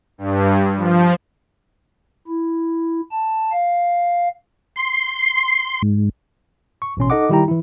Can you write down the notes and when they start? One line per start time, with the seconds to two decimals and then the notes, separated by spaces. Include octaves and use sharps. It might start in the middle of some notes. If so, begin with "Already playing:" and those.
0.18 G2
0.77 F3
2.27 E4
3.11 A5
3.52 F5
4.76 C6
5.82 G#2
6.82 C#6
6.97 A1 B2 C#4 C6
7.10 D#4 A4 D#5 F#5 D6
7.29 D#3 G3 E4 G4 G5 A#5
7.48 E3 E4